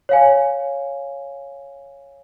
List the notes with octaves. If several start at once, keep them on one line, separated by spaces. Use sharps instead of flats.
C#5 F5 G#5